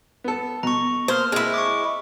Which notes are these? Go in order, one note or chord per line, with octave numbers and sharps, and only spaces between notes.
B3 A4
B2 A#5 C#6
A#3 C5 F6
G#3 C4 E4
C#6 D6